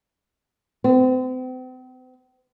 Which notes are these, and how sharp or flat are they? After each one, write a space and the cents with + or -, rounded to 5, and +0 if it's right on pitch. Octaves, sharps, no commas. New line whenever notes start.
C4 -40